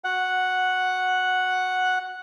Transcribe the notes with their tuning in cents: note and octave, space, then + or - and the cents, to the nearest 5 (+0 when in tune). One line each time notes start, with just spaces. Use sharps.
F#4 -15 F#5 +0